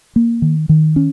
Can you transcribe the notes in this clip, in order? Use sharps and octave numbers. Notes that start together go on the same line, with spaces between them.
A#3
D#3
D#3
C#4